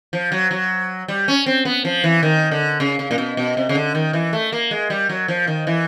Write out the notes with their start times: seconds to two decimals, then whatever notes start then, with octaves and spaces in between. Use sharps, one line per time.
0.13 F3
0.32 F#3
0.51 F#3
1.08 G3
1.28 C#4
1.46 C4
1.65 B3
1.85 F3
2.04 E3
2.23 D#3
2.51 D3
2.80 C#3
2.99 C#3
3.11 A#2
3.18 B2
3.37 B2
3.57 C3
3.69 C#3
3.75 D3
3.95 D#3
4.13 E3
4.33 A3
4.52 A#3
4.71 G#3
4.90 G3
5.09 F#3
5.28 F3
5.47 D#3
5.67 E3